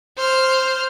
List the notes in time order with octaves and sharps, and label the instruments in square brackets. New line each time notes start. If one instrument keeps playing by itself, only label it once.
[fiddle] C5 F6